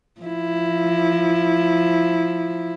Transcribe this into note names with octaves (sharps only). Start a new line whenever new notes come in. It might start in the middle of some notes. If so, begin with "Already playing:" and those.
F3 E4